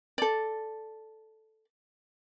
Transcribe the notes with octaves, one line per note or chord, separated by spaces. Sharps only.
A4 D5